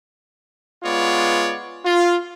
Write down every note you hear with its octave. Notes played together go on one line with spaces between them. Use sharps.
G#3 B3 F4 C#5 D5
F4